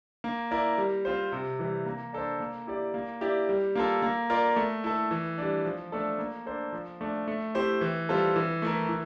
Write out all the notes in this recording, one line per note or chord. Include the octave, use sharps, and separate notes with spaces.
A#3
E4 A#4 D5
G3
C4 F4 C5
C3
E3 G3
A#3
D4 A4 C5
A#3
E4 G4 D5
A#3
E4 G4 D5
G3
A#3 F4 A4
A#3
F4 A#4 D5
A3
E4 A4
E3
G3 D4
F3
A3 D4 A4
A#3
D4 A4 C5
F3
A3 D4
A3
C4 E4 G4 C5
E3
G3 C4 F4 A4
E3
A3 E4 A#4
E3